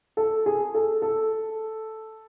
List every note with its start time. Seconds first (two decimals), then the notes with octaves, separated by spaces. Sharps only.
0.17 A4
0.46 G#4
0.74 A4
1.02 A4